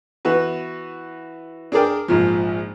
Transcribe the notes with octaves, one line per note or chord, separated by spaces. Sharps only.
E3 B3 F#4 B4
D4 G#4 A#4 D5 G5
A#1 G#2 F3